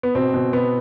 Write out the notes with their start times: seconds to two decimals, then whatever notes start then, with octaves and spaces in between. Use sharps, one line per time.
0.03 B3
0.15 B2 C4
0.34 B2
0.53 B2 B3